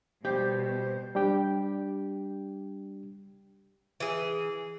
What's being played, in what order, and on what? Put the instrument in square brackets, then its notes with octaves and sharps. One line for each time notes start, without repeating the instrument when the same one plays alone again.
[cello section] B2 [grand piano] G3 [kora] G4 [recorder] C5
[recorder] C5
[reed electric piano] G3 D4 G4 G5
[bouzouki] E3 G#4